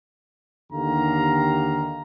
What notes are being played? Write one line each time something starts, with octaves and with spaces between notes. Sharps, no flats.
D#2 D3 D#3 G4 F5 A#5